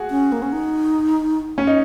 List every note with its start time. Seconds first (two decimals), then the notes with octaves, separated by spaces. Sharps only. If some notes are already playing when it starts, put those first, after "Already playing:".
Already playing: F#4 G#4
0.10 C#4
0.32 A#3
0.42 C#4
0.52 D#4
1.58 C#4
1.67 D#4